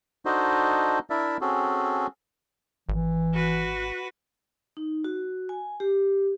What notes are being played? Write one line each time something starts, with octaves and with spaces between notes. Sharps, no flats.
D4 D#4 F#4 A4 C5 D#5
D4 E4 A#4 D5 E5
C4 C#4 F#4 G#4 A4
G#1 E3
F#4 B4
D#4
F#4
G#5
G4